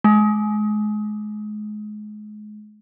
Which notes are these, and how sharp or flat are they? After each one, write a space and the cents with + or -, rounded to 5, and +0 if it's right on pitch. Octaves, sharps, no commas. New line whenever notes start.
G#3 +30